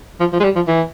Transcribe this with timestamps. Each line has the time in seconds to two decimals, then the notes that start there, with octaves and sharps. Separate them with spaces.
0.20 F3
0.32 F3
0.40 G#3
0.44 G3
0.55 F3
0.67 E3